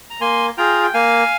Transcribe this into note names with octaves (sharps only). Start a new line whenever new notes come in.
A#5
A#3 G#5 C6
F4 G#4 G5 A#5
G5
A#3 F5 G#5